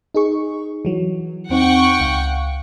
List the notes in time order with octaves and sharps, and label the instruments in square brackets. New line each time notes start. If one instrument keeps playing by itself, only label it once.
[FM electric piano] D#4 G#4 C#6
E3 F#3
[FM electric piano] E2 C4 D#4 [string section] F#5 G5 C#6
[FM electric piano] C#2 F5